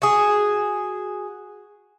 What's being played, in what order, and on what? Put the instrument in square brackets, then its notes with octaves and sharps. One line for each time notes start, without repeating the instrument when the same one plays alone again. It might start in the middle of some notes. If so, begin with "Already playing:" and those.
[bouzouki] F#4 G#4